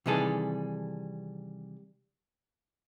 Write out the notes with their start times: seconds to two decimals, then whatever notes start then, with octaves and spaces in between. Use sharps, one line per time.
0.06 C3 D#3 E3 G3 G#4 A4